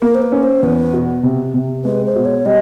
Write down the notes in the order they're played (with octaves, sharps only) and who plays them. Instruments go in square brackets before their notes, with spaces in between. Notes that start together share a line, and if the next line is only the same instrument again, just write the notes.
[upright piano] A#3 [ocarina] A#4
[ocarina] C5
B4
[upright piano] C#4
[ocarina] C5
[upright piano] E2 [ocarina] B4
[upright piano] B2
C3
C3
[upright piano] G#3 [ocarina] B4
[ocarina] C5
[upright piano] B2
[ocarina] C#5
[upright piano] G3 [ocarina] D#5